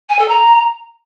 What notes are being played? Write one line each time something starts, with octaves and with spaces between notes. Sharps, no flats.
G#5
A4
A#5